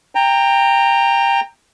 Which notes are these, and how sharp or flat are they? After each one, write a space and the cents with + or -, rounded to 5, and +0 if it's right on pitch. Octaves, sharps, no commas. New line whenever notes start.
G5 +20 A#5 -15